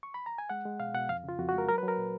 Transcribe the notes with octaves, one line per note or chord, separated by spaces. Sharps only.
C#6
B5
A#5
G#5
G#3 F#5
G#3
B2 F5
B2 F#5
F2 F5
C#3 F4
F2 F#4
F#4
G#3 A#4
F#3 A#4
B4
F#3
A#4
A#2